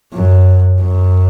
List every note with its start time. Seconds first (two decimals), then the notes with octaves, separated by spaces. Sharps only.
0.14 F#2
0.81 F#2